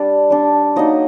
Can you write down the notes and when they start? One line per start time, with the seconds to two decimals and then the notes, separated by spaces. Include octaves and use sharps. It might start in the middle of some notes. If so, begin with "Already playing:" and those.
Already playing: G3 D4 D5
0.30 G3 D4
0.76 F#3 A#3 D#4 D#5